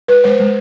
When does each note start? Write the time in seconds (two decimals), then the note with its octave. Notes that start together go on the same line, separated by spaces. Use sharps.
0.08 G#3 B4
0.24 G#3 C5
0.40 G#3